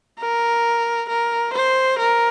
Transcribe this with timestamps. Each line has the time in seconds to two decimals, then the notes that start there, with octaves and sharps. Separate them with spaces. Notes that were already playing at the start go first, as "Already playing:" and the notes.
0.20 A#4
1.09 A#4
1.53 C5
1.98 A#4